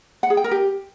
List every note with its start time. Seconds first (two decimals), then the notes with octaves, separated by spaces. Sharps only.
0.23 F#5
0.30 G#4
0.37 G5
0.44 A#4
0.51 G4